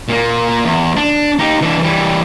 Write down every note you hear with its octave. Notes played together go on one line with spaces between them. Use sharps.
A#2 A#3
E2
D4
D#4 G4
E3 D4
E3 G3